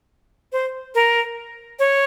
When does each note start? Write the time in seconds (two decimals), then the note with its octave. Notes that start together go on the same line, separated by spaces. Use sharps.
0.52 C5
0.95 A#4
1.79 C#5